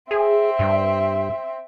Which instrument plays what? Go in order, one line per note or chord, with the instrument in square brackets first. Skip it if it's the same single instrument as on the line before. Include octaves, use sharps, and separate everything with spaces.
[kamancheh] C4 E5 [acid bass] G#4
[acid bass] G2